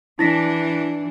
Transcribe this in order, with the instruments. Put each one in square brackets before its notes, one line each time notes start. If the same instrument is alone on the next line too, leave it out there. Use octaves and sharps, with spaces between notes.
[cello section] E3 D4 [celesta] E4 A#6 B6